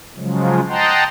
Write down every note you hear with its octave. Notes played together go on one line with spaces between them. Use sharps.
C#3 F3 F#3 G#3
D#5 F#5 G5 A5 A#5 C6